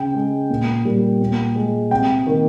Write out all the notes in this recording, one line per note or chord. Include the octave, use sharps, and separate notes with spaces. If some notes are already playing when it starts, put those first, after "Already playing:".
Already playing: C#3 G5
G#3
A#2
G3 A#3
A#2
G#3
C3 G5
D#3 A#3